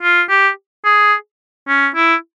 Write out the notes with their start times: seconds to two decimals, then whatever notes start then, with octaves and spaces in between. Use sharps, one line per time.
0.02 F4
0.29 G4
0.85 G#4
1.68 C#4
1.95 E4